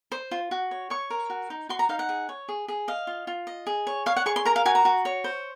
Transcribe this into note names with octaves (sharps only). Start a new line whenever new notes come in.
C5
F4
F#4
C#5
C#5 C#6
A#4
F#4
D#4
F#4 C6
A#5
D#4 F5
F#5
G#4
C#5
G#4
G#4
D#5 F5
F4
F4
D#5
G#4
C#5
C#5 F5
F#5
G#4 C#6
C6
A#4 A#5
F5
F#4 G#5
A#5
F#4
C#5
C5